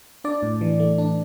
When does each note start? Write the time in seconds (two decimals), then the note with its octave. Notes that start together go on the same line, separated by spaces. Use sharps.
0.24 D4 D5
0.43 A2
0.61 E3
0.80 A3
0.98 D4